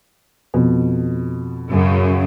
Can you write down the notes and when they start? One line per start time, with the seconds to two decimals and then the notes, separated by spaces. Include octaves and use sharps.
0.54 F2 B2
1.70 F#2 C#3